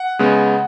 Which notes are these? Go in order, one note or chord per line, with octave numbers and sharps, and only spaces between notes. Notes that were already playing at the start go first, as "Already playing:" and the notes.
Already playing: F#5
C#3 G#3 B3